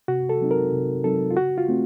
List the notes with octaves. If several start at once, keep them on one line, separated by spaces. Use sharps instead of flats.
C3 F#4
A4
F#3 C4 D#4
A#4
C3
F#3 C4 D#4 A4
F4
C#3 F#4
F4
A3 C4